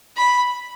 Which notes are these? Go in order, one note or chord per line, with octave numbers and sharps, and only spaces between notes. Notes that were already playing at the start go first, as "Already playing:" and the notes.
B5